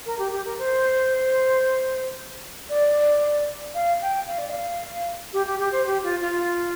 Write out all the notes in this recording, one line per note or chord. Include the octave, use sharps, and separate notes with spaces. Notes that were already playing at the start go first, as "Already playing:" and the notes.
A#4
G4
G4
A#4
C5
D5
F5
G5
F5
D5
F5
G4
G4
G4
C5
G4
F4
F4